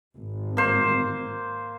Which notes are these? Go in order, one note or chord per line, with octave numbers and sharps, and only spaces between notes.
G#1
A#3 C5